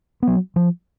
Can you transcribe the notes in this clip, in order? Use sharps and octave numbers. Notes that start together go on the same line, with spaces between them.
F#3 B3
F3